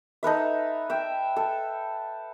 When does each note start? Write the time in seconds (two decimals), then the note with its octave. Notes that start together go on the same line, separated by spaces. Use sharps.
0.23 D#4 A4 B4 E5
0.90 E5 G5
1.36 A4